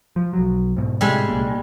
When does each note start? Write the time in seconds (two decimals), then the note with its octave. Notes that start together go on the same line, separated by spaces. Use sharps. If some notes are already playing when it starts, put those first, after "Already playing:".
0.16 F3
0.33 B1 F#3
0.77 G#2 B2
1.01 A2 C3 G3 G#3
1.29 C2 A#2 A#3